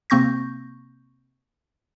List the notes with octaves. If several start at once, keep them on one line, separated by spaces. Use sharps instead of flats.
C3 A#3 C4 C#6 G6 A#6